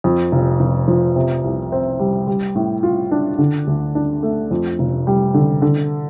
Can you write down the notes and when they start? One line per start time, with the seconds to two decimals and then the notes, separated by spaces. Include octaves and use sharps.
0.04 F2
0.32 F1
0.60 F1
0.88 F3
1.16 C3
1.44 C2
1.72 C4
1.99 G3
2.27 G3
2.55 A2
2.83 F4
3.11 D4
3.39 D3
3.67 D2
3.95 D4
4.23 A3
4.51 F2
4.79 F1
5.07 G3
5.34 D3
5.62 D3